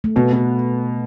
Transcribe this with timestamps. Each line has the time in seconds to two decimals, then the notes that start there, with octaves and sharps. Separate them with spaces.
0.04 A3
0.16 B2 B3
0.33 B2